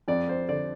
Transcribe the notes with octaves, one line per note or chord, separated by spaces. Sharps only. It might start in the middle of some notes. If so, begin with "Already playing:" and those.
F2 D5
C5
D3 D5